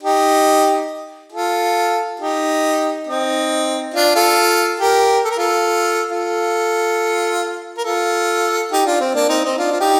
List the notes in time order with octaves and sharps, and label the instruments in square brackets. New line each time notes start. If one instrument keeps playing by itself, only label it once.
[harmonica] D#4 G4
F4 A4
D#4 G4
C4 D#4
D4 F4
F4 A4
G4 A#4
A4
A#4
F4 A4
F4 A4
A#4
F4 A4
D#4 G4
D4 F4
C4
A#3 D4
C4 D#4
C4 D#4
D4 F4
F4
D#4 G4